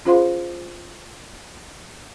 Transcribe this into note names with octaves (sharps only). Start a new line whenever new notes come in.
C#4 F4 G#4 C5 F5 C6